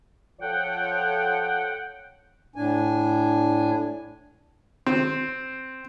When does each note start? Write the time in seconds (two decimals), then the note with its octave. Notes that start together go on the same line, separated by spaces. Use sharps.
0.41 F3 A4 C#5 F#5 G5
2.56 A2 D4 G#5
4.86 C4